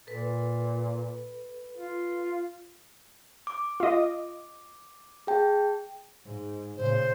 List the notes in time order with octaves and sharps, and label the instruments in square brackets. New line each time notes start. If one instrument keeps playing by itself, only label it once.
[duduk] A#2 [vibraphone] A4 B4
[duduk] F4
[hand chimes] D6
[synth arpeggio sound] F4 D#5
[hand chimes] G#4 G5 A5
[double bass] G#2
[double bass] A#2 C#3 [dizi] C5